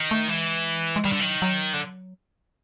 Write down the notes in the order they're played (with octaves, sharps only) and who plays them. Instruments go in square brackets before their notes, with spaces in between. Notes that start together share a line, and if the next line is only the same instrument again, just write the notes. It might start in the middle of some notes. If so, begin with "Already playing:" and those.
Already playing: [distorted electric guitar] D#3
[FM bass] A3
[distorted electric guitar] E3 [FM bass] G#3
[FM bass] G#3
[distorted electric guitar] D#3 [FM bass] G3
[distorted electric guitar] D3
[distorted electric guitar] D#3 [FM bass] F#3
[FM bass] F#3
[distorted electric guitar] D3